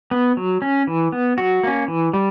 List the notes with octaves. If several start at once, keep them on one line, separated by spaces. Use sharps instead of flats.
B3
F#3
C#4
E3
B3
F#3 F#4
A#3 C#4
E3
G3